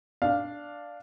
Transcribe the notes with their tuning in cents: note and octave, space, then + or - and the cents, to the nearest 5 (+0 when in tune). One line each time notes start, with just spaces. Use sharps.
D4 +0 F5 +0